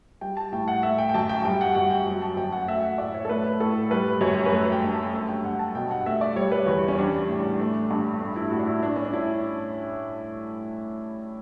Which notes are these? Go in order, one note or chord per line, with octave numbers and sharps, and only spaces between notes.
G3 G5
A5
A2 G5
F#5
A3 E5
G5
G5
F#2 A5
G5
G3 G5
F#5
F#2 F#5
G5
F#3
A5
F#2 G5
F#5
A3 E5
F#5
A2 D5
C#5
A4
A3 B4
A2 A4
G3 B4
F#2 C#5
B4
A3 A4
G5
G2
A5
A3
G5
G2 F#5
A5
B2 G5
F#5
A3 E5
D5
G3 C#5
B4
E2
C#4
G3 D4
A2
A3
G2
A3 D4
E4
A2 F#4
D4
E4
A3 D4
C#4
D4
A2 E4